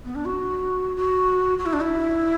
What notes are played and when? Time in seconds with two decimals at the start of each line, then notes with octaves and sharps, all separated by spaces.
0.05 B3
0.15 D4
0.26 F#4
0.97 F#4
1.59 F#4
1.66 E4
1.73 D4
1.81 E4